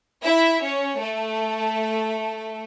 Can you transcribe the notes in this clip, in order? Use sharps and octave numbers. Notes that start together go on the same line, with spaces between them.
E4 E5
C#4 C#5
A3 A4